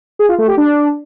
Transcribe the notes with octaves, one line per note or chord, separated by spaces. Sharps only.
G#4
F4
A3
G4
D4